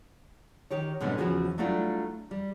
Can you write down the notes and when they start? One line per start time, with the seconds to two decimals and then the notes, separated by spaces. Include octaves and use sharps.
0.70 D#3 G4 C#5
1.01 G#2 B2 D3 G3 B3 C#4
1.17 E2 G#2 C#3 F3 F#4 G#4
1.58 F#3 G3 A3 D4 E4 F4
2.31 G3